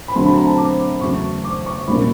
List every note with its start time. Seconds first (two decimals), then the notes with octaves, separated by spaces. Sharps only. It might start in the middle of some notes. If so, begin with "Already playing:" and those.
0.08 B5
0.15 D2 D3 F#3 A3 C4 C6
0.26 B5
0.36 A#5
0.47 A5
0.58 D6
1.01 E2 C#3 F#3 A3 C#6
1.44 D6
1.66 C#6
1.87 C2 A#2 F#3 A#3 C#4 B5